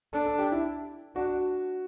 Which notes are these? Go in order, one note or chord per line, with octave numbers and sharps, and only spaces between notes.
D4 A4
A4
G4
E4
D4 F#4